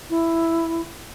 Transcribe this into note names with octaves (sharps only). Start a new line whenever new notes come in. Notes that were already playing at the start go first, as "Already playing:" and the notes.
E4